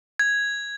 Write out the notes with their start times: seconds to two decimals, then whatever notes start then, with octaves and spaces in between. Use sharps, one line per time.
0.19 G#6